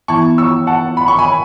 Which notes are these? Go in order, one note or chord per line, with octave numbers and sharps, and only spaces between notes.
E3 B3 E4 A5 C#6
C#6 E6
F#5 A5
B5
C#6
G#5 B5